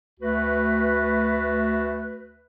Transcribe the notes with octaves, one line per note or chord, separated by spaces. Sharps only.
D2 A3 F#4 B4